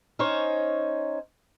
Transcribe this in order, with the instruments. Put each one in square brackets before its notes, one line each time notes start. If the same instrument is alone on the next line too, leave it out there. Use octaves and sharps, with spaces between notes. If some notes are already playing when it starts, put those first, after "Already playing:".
[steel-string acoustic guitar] C#4 D#4 C5 C#5